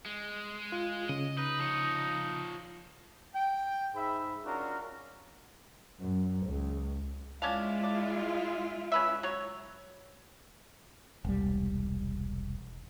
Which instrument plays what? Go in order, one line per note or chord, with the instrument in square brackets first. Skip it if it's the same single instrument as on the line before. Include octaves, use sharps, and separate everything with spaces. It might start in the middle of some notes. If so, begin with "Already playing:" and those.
[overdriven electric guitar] G#3
[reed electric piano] F4
[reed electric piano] C#3 [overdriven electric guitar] D#5
[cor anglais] D#4 [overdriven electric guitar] B4
[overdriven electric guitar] F3 C#5
[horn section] G5
G#2 E5 B5
C#4 D4 F4 F#4 A#4
[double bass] F#2
C#2
[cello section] G#3 E4 F4 [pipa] C#4 D4 F5
[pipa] D5
C#4 B4 E5
F#3 C#5
[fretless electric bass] E1 C2 G3